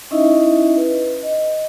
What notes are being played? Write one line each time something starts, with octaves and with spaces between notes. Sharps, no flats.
C#4 D#4 E4 D#5 E5
B4
D#5